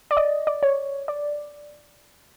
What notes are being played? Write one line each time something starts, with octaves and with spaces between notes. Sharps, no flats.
D5
D#5
D5
C#5
D5